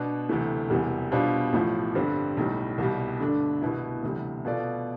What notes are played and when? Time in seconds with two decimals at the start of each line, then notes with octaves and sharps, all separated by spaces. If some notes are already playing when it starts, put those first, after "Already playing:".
Already playing: B2 B3 D4
0.29 D2 C3 E3 A3
0.70 E1 E2 C3 E3 G3
1.12 B2 G3 D4 F4 C5
1.53 A1 A2 F3
1.95 G2 D3 G3 C4
2.37 B1 A2 G3
2.78 C2 B2 G3
3.20 G2 D3 A3 D4
3.62 C2 B2 B3 E4
4.03 D2 C3 E3 G3
4.45 B2 B3 F4 A4 D5